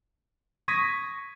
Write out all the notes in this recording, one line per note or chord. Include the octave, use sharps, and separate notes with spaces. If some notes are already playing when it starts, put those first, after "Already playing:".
C#6 D#6 G#6 A#6 B6 D#7